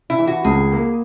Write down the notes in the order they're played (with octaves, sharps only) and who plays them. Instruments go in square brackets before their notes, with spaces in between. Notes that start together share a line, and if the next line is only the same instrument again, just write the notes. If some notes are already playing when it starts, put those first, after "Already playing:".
[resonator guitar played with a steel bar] E4
[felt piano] E3
[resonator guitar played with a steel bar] F#4
[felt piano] C#2 [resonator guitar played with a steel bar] G#4
[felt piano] A#3